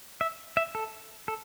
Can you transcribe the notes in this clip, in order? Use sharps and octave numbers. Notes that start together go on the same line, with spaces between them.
E5
E5
A4
A4